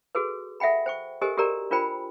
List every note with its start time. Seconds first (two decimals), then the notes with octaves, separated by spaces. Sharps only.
0.15 F#4 G#4 A4 B4
0.60 A4 E5 F#5 G5 B5
0.86 C5 G5 C#6
1.22 G4 A4 A#4 C5 D#5 G#5
1.37 F#4 G4 A4 A#4 D5 A#5
1.71 D4 F4 A#4 C5 G5 B5